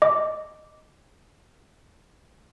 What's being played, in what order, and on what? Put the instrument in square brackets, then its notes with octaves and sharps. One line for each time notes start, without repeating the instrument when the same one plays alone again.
[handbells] D#5 D6